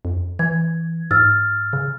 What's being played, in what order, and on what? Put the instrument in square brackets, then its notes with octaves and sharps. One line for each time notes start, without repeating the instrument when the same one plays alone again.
[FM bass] F2
[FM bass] E3 [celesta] G#6
[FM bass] G#2 [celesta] E6 F6 A6
[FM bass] C#3